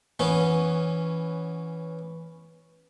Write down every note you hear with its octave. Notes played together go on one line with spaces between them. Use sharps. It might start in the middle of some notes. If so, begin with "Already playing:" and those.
E3 B3 C#4